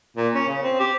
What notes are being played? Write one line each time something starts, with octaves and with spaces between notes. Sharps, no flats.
A#2
C#4
C#3
C4
G4